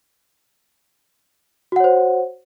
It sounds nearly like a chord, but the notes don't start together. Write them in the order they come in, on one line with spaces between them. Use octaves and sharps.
F#4 F#5 C#5 C5